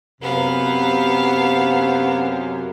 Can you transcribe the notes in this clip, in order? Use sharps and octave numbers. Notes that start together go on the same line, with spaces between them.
F#2 C3 B3 F5